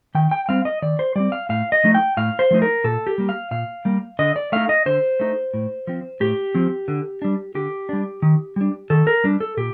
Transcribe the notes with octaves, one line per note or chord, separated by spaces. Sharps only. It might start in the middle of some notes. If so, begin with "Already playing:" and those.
D#3 G5
G5
G3 C4 F5
D#5
D#3 D5
C5
G3 C4 D5
F5
A2 F5
D#5
F3 A3 D#4
G5
A2 F5
C5
F3 A3 D#4
A#4
A#2 A4
G4
G3 A#3
F5
A#2 F5
G3 A#3
D3 D#5
D5
A3 D#4 F5
D#5
D3 C5
A3 D#4
A2
F3 C4
A2 G4
F3 C4
D3
G3 D4
D3 G4
G3 D4
D#3
G3 D4
D#3 A4
A#4
G3 D4
A4
A#2 G4